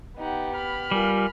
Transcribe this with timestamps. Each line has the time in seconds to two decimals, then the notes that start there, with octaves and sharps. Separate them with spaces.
0.18 B3 D#4 G4 F#5
0.54 B5 F6
0.91 G3 F4 A#4 G#5